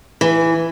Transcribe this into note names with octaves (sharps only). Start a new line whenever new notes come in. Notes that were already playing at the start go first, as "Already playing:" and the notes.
E3